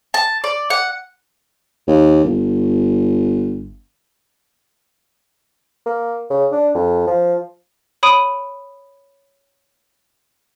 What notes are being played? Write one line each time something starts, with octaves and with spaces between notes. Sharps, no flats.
A5
D5
F#5
D#2
G1
A#3
C#3
D4
F2
F3
C#5 B5 D#6 D7 D#7